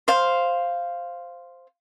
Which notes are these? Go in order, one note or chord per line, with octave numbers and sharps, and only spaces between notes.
C5 F5